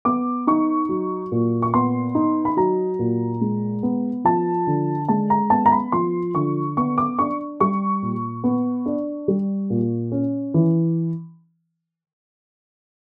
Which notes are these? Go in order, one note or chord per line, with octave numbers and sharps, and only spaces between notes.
B3 D6
D#4 C#6
F#3
A#2
C#6
B3 C6
D#4
B5
F#3 A#5
A#2
G#3
B3
F3 A5
D3
G#3 A5
A#5
B3 A5
A#5
B5
F3 C6
D3 C#6
B3 C#6
D6
D4 C#6
G3 C#6
A#2
B3
D4
G3
A#2
C#4
E3